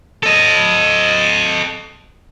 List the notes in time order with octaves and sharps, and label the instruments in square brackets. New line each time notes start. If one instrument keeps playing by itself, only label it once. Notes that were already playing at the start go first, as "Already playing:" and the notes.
[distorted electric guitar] A4 D#5